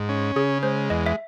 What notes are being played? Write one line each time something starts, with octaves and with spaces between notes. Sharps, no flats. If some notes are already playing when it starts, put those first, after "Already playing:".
Already playing: G#2
C#4
C#3 G#4
G#3 C5
E2 D#5
E5